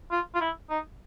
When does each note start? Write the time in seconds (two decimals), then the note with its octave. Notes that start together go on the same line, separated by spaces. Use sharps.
0.11 F4
0.34 F4
0.41 E4
0.70 D#4